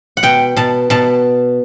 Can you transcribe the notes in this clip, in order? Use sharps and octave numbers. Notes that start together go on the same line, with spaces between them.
F#5
B2 G5
B2 A5
B2 A5